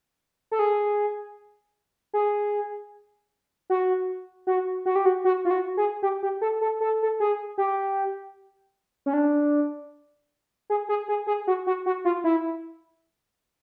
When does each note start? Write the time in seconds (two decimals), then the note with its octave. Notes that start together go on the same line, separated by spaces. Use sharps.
0.52 A4
0.59 G#4
2.14 G#4
3.70 F#4
4.47 F#4
4.86 F#4
4.95 G4
5.06 F#4
5.25 F#4
5.45 F4
5.51 F#4
5.77 G#4
6.02 G4
6.23 G4
6.41 A4
6.61 A4
6.81 A4
7.03 A4
7.20 G#4
7.58 G4
9.06 C#4
9.13 D4
10.70 G#4
10.89 G#4
11.08 G#4
11.27 G#4
11.47 F#4
11.67 F#4
11.86 F#4
12.05 F4
12.24 E4